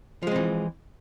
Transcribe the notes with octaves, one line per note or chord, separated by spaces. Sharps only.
E3 F3 G#3 C4